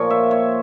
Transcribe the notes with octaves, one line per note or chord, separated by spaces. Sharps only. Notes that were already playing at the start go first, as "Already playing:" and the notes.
Already playing: A#2 F3 C#5
E5
C#5